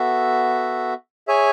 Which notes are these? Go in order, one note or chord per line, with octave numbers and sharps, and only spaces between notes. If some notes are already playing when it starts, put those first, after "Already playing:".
Already playing: B3 F#4 A4 E5
G#4 C#5 E5 G#5